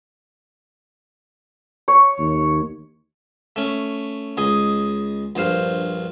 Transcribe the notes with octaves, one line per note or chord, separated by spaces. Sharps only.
C#5
D#2
A3 C#4
C#2 G#4 D#5
A#1 G2 C5 F5